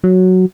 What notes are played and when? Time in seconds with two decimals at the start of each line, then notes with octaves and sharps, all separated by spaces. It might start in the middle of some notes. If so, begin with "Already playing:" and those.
0.04 F#3